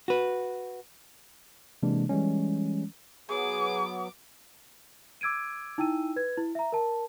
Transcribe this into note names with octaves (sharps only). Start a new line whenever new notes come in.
F#4 B4
C3 E3 G#3 A#3 D4
E3 G3 G#3 C#4
F#3 B3 G#4 D6
D6 E6 G#6 D7 D#7
D#4 E4 G5 E6 D#7
B4 G#6
E4
E5 A#5
A#4 A5